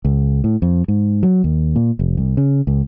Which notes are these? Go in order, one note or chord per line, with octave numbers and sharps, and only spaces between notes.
C#2
A2
F2
G#2
F#3
D#2
A#2
F1
C2
C#3
C#2